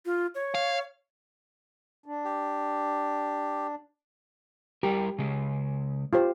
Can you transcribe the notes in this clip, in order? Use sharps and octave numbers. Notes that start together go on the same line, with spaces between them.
F4
C#5
F5
D4
G4
G3 E4 G4 A#4
C#3 G#3
F4 G4 C5